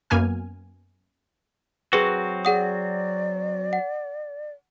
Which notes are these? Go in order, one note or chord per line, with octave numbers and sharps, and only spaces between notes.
F#2 A#3 B3 G#5 F6
F#3 C4 F#4 G#4 B4
G#4 D5 F#5 D#6
F#5